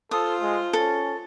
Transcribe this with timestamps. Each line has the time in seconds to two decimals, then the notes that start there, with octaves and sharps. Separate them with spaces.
0.11 F4 A4 C5 D#6
0.41 G#3
0.73 C#4 A4